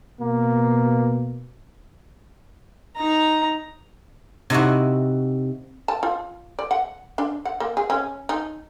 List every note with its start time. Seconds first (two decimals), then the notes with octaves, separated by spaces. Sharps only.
0.21 B2 A#3
2.97 D#4 A#5
4.50 C3 D#4 E4 F#4
5.88 A5
6.03 F4
6.59 D5
6.71 F#5
7.18 D4
7.45 F#5
7.60 A#3
7.77 G#4
7.90 C#4
8.29 D#4